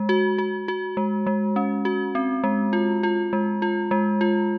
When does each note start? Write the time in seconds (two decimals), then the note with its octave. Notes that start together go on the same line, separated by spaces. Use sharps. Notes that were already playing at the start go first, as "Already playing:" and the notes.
Already playing: G#3
0.09 F#4
0.38 F#4
0.68 F#4
0.97 G#3
1.27 G#3
1.56 C#4
1.85 F#4
2.15 C4
2.44 G#3
2.73 F4
3.03 F4
3.33 G#3
3.62 F4
3.91 G#3
4.21 F4